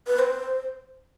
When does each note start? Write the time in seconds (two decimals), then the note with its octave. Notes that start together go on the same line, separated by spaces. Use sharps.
0.07 B4
0.19 C5